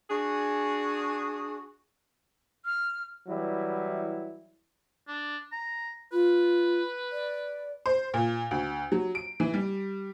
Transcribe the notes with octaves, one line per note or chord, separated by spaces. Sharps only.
D4 F#4 G#4
F6
E3 F#3 G3 E4
D4
A#5
F4 B4
D5
C5
A#2
D2
F#3
D7
E3
G3